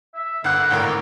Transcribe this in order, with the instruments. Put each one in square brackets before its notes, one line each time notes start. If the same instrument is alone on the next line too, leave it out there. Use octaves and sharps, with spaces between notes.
[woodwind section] E5
[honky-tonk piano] G1 F#5 F#6 [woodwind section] D3 A#3
[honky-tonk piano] G#1 A2 A#4